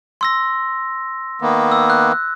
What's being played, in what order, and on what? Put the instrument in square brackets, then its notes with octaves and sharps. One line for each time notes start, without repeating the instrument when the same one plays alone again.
[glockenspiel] C6 E6 A#6
[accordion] D#3 A#3 B3
[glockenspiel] E6
F#6